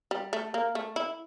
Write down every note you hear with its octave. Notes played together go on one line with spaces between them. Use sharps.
G3
A3
A#3
A3
E4